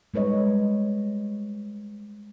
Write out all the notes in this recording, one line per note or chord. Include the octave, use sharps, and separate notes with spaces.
G3 G#3 B4 C#5 D#5